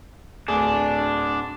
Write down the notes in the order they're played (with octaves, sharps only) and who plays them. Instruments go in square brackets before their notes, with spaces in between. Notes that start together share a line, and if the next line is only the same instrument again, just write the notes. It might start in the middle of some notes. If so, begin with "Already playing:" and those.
[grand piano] D1 D2 G#4 [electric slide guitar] D4